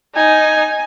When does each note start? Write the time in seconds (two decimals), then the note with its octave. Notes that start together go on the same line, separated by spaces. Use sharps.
0.16 D#4 G#5